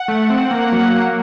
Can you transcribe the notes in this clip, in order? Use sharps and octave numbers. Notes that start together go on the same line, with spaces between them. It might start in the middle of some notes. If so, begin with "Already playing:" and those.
Already playing: F#5
A3
C4
A#3
F#3
A#3